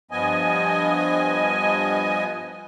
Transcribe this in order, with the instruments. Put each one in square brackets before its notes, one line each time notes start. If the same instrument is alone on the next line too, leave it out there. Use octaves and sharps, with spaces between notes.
[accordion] G2 F3 B3 D#5 G#5